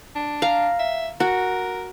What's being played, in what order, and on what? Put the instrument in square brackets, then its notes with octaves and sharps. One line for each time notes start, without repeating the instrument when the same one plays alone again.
[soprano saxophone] D4
[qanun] F5 A#5
[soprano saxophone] E5
[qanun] F#4 [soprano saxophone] A#4